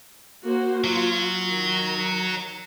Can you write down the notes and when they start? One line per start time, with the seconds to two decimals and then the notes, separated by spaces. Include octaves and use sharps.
0.44 A#3 F#4 C5
0.84 F#3 F4
1.45 D#3 A#5